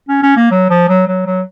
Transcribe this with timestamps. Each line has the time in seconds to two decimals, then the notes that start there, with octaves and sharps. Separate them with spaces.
0.09 C#4
0.22 C#4
0.36 A#3
0.51 F#3
0.70 F3
0.89 F#3
1.07 F#3
1.26 F#3